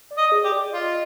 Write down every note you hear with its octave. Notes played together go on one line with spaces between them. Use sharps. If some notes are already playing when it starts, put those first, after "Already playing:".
D5
D#5
G#4
G4
D5
F4 D#5